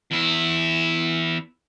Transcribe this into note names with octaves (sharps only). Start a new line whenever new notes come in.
E2 E4